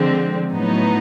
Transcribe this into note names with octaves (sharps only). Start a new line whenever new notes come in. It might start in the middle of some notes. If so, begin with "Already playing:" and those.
Already playing: D3 F3 G#3 C4
A2 F#3 B3 D#4